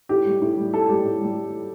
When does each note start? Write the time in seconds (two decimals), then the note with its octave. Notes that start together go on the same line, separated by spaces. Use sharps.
0.09 A2 G4
0.26 G3
0.42 A2
0.58 G3
0.74 A2 A4
0.89 G3 G4
1.05 A2
1.21 G3